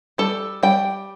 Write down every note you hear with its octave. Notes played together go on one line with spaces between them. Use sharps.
G3 A4
G3 G5